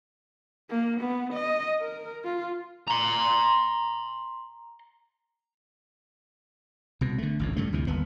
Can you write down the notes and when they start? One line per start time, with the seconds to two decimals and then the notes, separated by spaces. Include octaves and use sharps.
0.70 A#3
1.00 B3
1.33 D#5
1.81 A#4
2.24 F4
2.88 A#5 C6
7.01 C2 B2
7.18 D3 A3
7.39 G#1 C#2 A2
7.56 G2 C#3 A3
7.73 D2 C3 E3
7.87 G1 D#2 B3